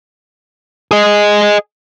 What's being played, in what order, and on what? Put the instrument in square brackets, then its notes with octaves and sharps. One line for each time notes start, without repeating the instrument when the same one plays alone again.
[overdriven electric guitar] G#4 D#5